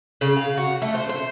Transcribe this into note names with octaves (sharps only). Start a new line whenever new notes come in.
C#3
F5
F#4
A3
C5
C5